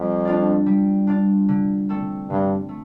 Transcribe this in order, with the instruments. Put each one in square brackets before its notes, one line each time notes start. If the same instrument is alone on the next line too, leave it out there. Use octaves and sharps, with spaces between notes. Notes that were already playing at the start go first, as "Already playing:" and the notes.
Already playing: [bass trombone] F2 [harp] G3
[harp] D4 F4 D5
G3
D4 F4 D5
D3
A3 C4 A4 D5
[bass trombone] G2 [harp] D3
[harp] A3